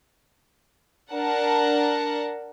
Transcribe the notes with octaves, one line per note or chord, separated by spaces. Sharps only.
D4 A#4 F#5 A5